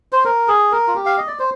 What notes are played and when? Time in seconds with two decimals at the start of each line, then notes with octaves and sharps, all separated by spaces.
0.12 C5
0.25 A#4
0.48 G#4
0.72 A#4
0.87 F4
0.95 G4
1.06 F5
1.17 D#5
1.28 D5
1.39 C5